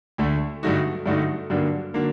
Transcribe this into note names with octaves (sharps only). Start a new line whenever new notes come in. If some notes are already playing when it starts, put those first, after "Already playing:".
D2 D3 A3
G2 D3 A3 D#4 F#4
G2 D3 A3 D#4 F#4
G2 D3 F#3 A#3 D4
D3 F#3 A#3 D4